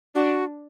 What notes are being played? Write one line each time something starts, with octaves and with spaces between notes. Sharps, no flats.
D4 F#4